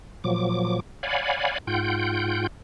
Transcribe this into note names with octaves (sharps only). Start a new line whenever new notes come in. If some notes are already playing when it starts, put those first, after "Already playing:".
A#2 F3 F#3 D6
C#5 D5 F5 F#5 G#5 B5
G#2 F4 F#5 G5 G6